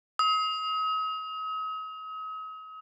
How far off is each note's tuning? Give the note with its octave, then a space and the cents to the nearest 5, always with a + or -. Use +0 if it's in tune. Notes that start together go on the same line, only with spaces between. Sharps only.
D#6 +40